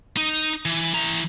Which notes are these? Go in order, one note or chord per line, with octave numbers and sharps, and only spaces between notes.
D#4
E3
E3 A#5